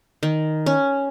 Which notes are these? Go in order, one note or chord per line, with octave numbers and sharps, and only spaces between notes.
D#3
C#4